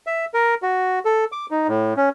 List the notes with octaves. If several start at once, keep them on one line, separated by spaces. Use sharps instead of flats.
E5
A#4
F#4
A4
D6
D#4
A2
C#4